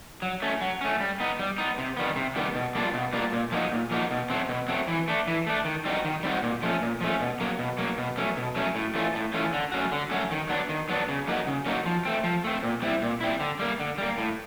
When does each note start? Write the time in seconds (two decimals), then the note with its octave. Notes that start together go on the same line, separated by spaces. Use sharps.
0.22 F#3
0.42 A3 C#4
0.61 F#3
0.81 A3 C#4
1.00 G3
1.20 B3 D#4
1.39 G3
1.58 B3 D#4
1.78 C3
1.97 D#3 G3 B3
2.16 C3
2.36 D#3 G3 B3
2.55 B2
2.75 G3 A#3 D4 F4
2.94 B2
3.13 G3 A#3 D4 F4
3.32 A#2
3.52 F3 A#3 D#4 F#4
3.72 A#2
3.91 F3 A#3 D#4 F#4
4.11 B2
4.30 F#3 A3 C4
4.49 B2
4.69 F#3 A3 C4
4.88 E3
5.08 A3 D4
5.27 E3
5.47 A3 D4
5.65 D#3
5.85 G3 C4 D#4 F#4
6.05 D#3
6.23 G3 C4 D#4 F#4
6.42 A#2
6.62 F3 A3 C#4
6.82 A#2
7.01 F3 A3 C#4
7.20 B2
7.40 F#3 A#3
7.59 B2
7.78 F#3 A#3
7.98 B2
8.18 F#3 A3 C#4
8.37 B2
8.56 F#3 A3 C#4
8.75 A2
8.95 E3 A3 C#4 F4
9.14 A2
9.34 E3 A3 C#4 F4
9.53 D3
9.72 F#3 A3 C#4 F#4
9.92 D3
10.11 F#3 A3 C#4 F#4
10.31 D#3
10.49 F#3 B3 D4
10.69 D#3
10.89 F#3 B3 D4
11.09 C#3
11.28 F#3 A#3 D#4 F#4
11.47 C#3
11.66 F#3 A#3 D#4 F#4
11.85 F3
12.05 A3 C4
12.24 F3
12.44 A3 C4
12.63 A#2
12.82 G3 C4 E4
13.02 A#2
13.21 G3 C4 E4
13.40 D3
13.59 G3 A#3
13.80 D3
13.98 G3 A#3
14.18 A2